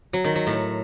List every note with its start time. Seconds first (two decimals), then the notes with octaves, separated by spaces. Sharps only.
0.13 F#3
0.24 D#3
0.36 F#3
0.47 A2